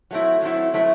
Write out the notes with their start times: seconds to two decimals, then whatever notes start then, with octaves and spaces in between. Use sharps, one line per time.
0.11 F#3 A3 C4 E4
0.42 F#3 A3 C4 E4
0.74 F#3 A3 C4 E4